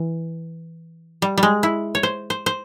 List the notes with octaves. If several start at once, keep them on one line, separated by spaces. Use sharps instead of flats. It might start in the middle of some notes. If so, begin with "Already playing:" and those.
Already playing: E3
G3
G3
G#3
E4
C#5
C5
C5
C5